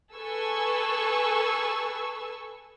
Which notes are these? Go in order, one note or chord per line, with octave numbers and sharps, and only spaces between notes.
G#4 A4 B4 G#5 C#6 E6